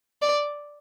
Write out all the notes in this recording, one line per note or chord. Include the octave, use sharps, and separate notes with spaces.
D5